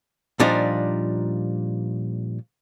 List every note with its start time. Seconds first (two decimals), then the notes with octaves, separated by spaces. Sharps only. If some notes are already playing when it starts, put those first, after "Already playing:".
0.40 A#2 F3 G3 D4 D#4